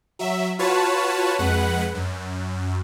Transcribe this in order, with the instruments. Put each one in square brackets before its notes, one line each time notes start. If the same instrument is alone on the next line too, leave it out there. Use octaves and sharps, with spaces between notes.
[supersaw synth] F#3 E5
F4 F#4 B4 C#5 A5
F2 G#3 B4 F#5
F#2